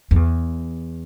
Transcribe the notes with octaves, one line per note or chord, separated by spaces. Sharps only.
F2
E2